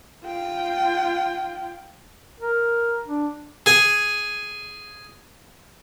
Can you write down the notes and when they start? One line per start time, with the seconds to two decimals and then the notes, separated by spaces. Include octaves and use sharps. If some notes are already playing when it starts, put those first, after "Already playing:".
0.25 F4 G5
2.40 A#4
3.07 D4
3.66 G#4 G#5